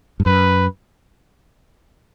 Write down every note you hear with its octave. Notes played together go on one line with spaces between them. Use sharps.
G2
F#2 B4